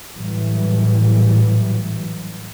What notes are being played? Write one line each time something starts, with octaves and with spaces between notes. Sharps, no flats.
A2 E3 F#3 G3